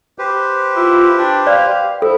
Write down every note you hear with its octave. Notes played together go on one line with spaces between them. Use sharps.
G4 B4 C5
E4 F4
D4 G5
D5 F5
E4 A4 C5